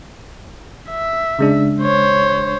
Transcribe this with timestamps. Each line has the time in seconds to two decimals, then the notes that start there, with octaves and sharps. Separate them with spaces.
0.90 E5
1.39 C#3 G#3 D4
1.82 C5 C#5